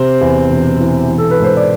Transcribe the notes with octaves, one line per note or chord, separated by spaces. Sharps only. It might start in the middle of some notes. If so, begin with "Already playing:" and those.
Already playing: C3 C4 C5
E2
E1
E3
E3
A4
B4
G#2 C5
D5